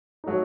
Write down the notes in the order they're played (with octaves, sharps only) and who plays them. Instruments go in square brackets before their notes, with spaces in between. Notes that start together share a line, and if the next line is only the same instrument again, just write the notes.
[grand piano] F#3 A3 D#4